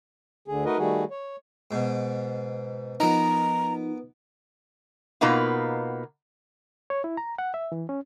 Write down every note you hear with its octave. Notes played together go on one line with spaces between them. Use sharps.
D2 D3 G#4
A3 D#4 F#4 A#4 B4 D#5
D#3 G3 A3 F#4 G#4
C#5
G#2 B2
F3 B3 D#4 A#4 A#5
B2 A#3 B3 D#4 F4
C#5
E4
A#5
F#5
E5
E3
C#4